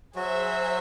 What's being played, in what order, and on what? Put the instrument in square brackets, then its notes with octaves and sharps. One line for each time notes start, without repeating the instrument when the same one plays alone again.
[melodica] F#3 F#4 [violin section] G#4 C5 E5